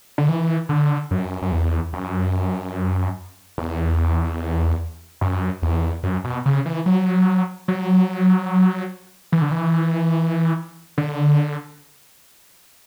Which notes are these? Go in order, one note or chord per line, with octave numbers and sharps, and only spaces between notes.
D3
E3
D3
F#2
F#2
E2
F#2
E2
F#2
E2
F#2
B2
C#3
E3
F#3
F#3
E3
D3
E3
D3